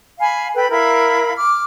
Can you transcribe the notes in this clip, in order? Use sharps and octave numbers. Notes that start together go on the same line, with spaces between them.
F5 G#5 B5
A4 B4 G5 B5
E4 A#4 F5 B5
D6 F6